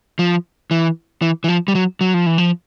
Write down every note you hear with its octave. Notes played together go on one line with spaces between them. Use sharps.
F3
E3
E3
E3
F3
G3
F#3
F#3
F3
E3
F3